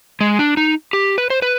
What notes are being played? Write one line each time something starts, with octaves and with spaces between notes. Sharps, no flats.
G#3
D4
D#4
G4
B4
C5
B4